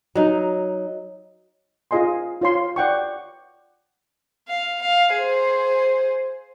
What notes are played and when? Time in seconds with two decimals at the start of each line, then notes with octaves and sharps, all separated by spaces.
0.15 F#3 D#4
1.91 F4 G#4 D#5 G#5 C6
2.42 F4 C#5 C6
2.76 D5 F#5 G5 C#6
4.48 F5
4.82 F5
5.13 G#4 C5